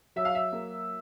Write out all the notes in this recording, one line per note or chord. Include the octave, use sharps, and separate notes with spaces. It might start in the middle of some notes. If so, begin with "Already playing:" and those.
F#3 E5
F5
E5
A#3